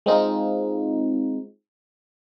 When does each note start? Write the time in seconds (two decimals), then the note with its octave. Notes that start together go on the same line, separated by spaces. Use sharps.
0.06 G#3 C4 D#4 F4